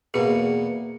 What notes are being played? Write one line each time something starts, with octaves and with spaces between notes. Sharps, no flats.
E2 B2 A#3 G#4 C#7